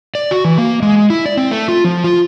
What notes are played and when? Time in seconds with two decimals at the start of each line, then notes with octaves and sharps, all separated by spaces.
0.15 D5
0.31 F#4
0.45 E3
0.58 A#3
0.82 G#3
1.10 E4
1.26 D5
1.37 C4
1.51 A3
1.68 F4
1.85 F3
2.04 F4